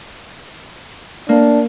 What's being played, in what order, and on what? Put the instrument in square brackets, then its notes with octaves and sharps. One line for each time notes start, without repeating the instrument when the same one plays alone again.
[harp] A#3 [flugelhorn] D4